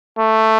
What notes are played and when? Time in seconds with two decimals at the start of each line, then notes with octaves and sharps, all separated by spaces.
0.19 A3